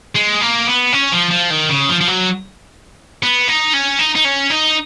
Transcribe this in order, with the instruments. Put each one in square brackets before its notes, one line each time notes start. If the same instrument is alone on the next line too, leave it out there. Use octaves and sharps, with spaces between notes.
[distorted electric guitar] G#3
A#3
B3
C#4
F3
F3
D#3
C#3
F3
F3
F#3
B3
D#4
C#4
D#4
D#4
C#4
D#4